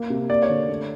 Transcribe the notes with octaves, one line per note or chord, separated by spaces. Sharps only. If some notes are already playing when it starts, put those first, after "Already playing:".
Already playing: A#3
C3
A#3 D5
C#5
D3
A3